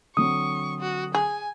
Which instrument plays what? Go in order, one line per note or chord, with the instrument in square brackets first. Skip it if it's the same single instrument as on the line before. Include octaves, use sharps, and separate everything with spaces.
[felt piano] D3 F#3 C4 [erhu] C#6 [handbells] D#6
[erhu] F#4
[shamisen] G#4 [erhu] G#5